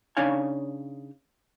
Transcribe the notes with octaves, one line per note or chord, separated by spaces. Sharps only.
C#3 D4 D#4 C#5 F5 G#5